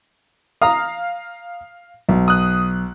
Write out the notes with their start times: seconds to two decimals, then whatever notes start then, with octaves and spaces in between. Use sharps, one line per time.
0.62 F5 A#5 D#6
2.09 B1
2.28 D#6 F#6